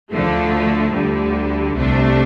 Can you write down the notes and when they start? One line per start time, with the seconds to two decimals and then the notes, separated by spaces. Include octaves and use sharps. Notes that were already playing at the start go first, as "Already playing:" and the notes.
0.11 D2 D3 F3 A3
0.92 D2 D3 G3
1.75 C2 C3 A3 D4